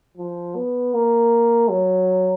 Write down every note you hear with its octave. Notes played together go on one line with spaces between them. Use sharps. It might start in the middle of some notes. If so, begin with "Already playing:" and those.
F3
B3
A#3
F#3